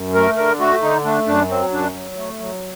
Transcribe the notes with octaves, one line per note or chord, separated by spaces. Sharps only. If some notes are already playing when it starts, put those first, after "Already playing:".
Already playing: F#2
A3 A#4
D3 A#4
A3 F#4
D3 D#4
A3 D4
F#2 D4
F#3 C4
F#2 D4
F#3
A3
F#3